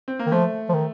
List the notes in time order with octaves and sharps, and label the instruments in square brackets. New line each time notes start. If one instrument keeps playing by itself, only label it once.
[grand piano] C4
A#3
[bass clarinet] D#3
[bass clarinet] F3 [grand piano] A3
[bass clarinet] F3
D#3